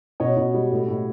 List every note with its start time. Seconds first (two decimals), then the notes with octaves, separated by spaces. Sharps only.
0.20 B2 C#5 D#5
0.37 B2
0.54 G3
0.71 A2
0.88 A2